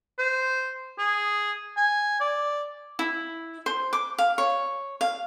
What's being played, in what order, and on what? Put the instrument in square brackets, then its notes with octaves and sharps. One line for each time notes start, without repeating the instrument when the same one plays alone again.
[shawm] C5
G#4
G#5
D5
[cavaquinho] E4
C5
D6
F5
C#5
F5